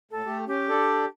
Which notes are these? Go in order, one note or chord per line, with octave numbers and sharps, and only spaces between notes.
A2 A4
A3 G4
C#4 G4
D4 A4 D5